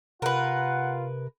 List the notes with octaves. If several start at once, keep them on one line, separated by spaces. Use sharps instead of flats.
C3 F4 A#4 B4 F#5